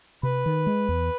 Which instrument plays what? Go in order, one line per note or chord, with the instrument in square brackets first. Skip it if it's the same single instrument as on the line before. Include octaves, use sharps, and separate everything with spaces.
[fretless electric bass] C3 [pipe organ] B4
[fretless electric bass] D#3
G#3
E2